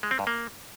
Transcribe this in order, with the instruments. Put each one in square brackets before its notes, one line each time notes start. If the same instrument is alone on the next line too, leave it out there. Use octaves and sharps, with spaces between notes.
[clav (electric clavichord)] G#3
C4
G2
A#3